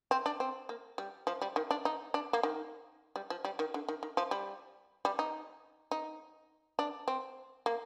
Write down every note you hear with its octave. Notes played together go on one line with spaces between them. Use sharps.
C4
D4
C4
A#3
G3
F3
G3
D#3
D4
D#4
D4
A#3
D#3
G3
F3
G3
D#3
D3
D#3
D#3
F3
G3
G3
D#4
D#4
D4
C4
A#3